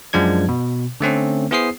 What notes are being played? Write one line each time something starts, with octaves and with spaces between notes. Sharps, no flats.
F#2 F3 G#3 D4 G#6
B2
D3 A3 C4 C#4
B3 E4 G#4 C5 D#6 C7